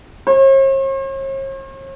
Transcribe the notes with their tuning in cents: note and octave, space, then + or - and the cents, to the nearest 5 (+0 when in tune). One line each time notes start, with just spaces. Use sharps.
C#5 -45